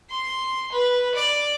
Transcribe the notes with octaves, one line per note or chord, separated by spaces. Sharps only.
C6
B4
D5